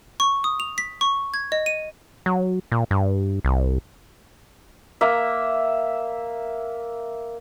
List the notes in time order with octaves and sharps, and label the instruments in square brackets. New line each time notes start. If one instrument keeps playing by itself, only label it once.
[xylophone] C#6
D#6
F7
B6
C#6
G#6
D#5
D#7
[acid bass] F#3
A#2
G2
C2
[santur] A#3 E5